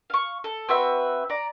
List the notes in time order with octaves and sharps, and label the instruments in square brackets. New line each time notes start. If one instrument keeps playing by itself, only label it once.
[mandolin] F5 C#6
A4
C4 F#4 B4 E5
D5 A#5